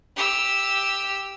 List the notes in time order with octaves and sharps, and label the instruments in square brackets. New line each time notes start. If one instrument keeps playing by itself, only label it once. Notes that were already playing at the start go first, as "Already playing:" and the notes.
[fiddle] G4 E6